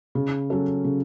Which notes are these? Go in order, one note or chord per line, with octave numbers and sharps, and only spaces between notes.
C#3
F#3 C#4 F#4 A4
C#3